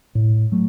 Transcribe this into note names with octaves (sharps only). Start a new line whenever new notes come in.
A2
F#3 A3